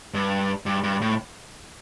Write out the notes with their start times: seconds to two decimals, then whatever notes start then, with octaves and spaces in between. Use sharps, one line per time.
0.14 G2
0.66 G2
0.83 G2
1.01 A2